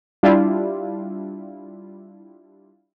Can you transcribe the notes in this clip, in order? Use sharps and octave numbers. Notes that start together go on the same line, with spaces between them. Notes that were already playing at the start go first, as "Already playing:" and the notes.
G3 D4 E4 F4